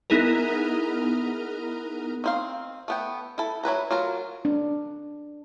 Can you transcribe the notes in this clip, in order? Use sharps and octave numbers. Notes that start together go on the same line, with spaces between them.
B3 D#4 E4 G#4 A#4
D#3 C4 F5
A3 B3 G5
E4 A4
F#3 E4 B4 A#5
F#3 F4 A#4
D4